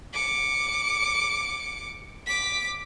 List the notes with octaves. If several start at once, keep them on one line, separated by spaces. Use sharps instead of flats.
D6 C#7
D6 B6